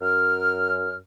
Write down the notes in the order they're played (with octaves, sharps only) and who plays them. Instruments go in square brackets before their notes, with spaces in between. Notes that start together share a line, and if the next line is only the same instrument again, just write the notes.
[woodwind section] F#2 F6